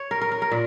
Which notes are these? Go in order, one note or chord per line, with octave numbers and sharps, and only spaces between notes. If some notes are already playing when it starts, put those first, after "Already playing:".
Already playing: C#5
A#4
A#4
A#4
A#4
A#2